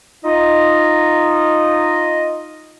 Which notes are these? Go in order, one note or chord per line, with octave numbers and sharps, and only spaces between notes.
D#4 F4 D#5